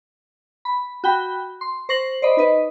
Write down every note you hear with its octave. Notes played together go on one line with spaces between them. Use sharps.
B5
F#4 G5 B5
C6
C5 C#6 A#6 F#7
C5 D5 D#5 B5
D#4 B4 D#5